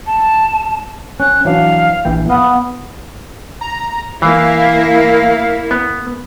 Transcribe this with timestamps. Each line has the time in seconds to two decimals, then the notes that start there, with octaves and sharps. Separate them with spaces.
0.07 A5
1.20 C#4 F#6
1.45 E3 F#3 D4 F5
2.05 A#1 E3 G5
2.30 B3 F5 D#6
3.61 A#5
4.22 E3 A#3 E4 F5
5.71 B3